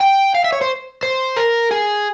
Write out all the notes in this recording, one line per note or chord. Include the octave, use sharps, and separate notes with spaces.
G5
F5
E5
C#5
C5
C5
A#4
G#4